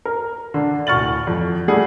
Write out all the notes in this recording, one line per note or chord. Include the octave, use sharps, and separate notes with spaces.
A#4
D3 D4
D1 F#4 C#6 F6 A6 F#7
F2
G3 A3 G4 G#4 D5 F#5